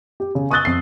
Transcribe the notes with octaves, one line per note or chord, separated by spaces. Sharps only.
G4
C#3
C#6 D#6 E6 F#6 A6 G7
F2 C7